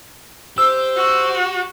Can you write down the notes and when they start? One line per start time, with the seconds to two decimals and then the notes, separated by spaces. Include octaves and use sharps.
0.58 G4 C5 E6
0.96 F#4